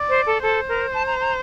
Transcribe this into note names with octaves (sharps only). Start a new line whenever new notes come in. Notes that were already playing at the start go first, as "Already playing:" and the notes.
Already playing: D5
C5
A4
A4 C5
A#4
A5
A#5
A#5